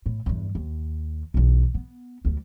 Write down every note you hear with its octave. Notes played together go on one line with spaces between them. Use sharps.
A2
E2 G2
D#2
B1 E2
B3
D2 G3